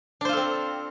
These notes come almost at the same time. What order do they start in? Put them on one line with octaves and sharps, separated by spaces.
D4 C5 F4 A4 C4